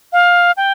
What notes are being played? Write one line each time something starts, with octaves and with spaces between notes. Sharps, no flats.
F5
G5